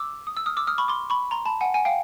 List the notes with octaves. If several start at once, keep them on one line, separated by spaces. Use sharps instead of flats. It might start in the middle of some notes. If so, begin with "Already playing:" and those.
Already playing: D6 E6
D#6
E6
D#6 F6
D6 E6
D#6 F6
B5 C#6
C6 D6
B5 C#6
A#5 C6
A5 B5
F#5 G#5
F#5 G#5
F5 G5